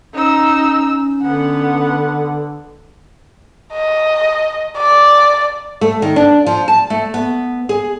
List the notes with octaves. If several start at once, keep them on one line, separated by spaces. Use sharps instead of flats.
C#4 D#4 E6
D3 B3 F#5
D#5
D5
A3
D#3
D4
F3
A5
A3
B3
G#4